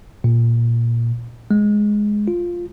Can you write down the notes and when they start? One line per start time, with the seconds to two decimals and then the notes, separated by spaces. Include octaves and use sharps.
0.24 A#2
1.51 G#3
2.28 F4